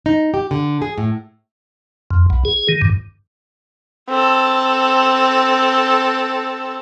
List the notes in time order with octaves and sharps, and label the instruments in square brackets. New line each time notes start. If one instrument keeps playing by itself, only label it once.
[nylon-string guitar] D#4
G4
D3
G#4
A2
[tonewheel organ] F2
B1
G#4
D#3
G2
[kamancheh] C4 A4